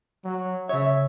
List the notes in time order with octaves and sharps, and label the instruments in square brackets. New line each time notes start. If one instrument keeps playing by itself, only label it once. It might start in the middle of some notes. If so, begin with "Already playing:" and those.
[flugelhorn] F#3
[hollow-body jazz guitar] C#3 C#5 [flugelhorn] E5